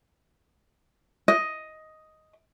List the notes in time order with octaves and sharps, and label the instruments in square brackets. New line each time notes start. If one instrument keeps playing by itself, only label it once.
[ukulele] D#5